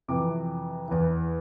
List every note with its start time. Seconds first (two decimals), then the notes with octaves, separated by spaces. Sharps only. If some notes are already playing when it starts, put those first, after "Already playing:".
0.08 F2 C3 E3 D6
0.88 E2 E3